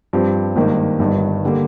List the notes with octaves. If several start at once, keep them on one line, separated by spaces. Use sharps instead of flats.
G2 F3 C4 G4
G#1 G2 D#3 A#3
G1 G2 D#3
D3 G3 A#3